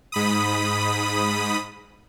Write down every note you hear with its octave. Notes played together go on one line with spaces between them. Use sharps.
G#2 B5 D#6